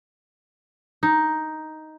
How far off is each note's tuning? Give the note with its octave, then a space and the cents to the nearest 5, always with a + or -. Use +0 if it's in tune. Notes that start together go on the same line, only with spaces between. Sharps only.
D#4 +5